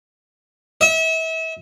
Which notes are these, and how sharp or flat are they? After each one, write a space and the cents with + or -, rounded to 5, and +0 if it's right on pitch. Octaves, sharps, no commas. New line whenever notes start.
E5 -35